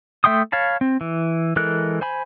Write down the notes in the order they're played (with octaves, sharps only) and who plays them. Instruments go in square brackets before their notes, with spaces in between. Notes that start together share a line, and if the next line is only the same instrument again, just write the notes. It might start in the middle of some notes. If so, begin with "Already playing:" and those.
[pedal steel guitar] A3 E5 G5 C6 D#6
C#5 F5 A5 B5
C4
E3
E3 G#3 A4 A#4 F#6
C5 G#5 B5